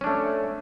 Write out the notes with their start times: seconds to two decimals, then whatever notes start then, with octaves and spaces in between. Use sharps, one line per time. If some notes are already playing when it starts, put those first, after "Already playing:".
0.01 C#4
0.04 D4
0.07 A3